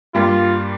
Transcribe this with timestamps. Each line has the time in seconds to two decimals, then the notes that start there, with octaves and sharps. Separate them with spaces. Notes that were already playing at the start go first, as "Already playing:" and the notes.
0.14 G2 G3 A#3 F4 G4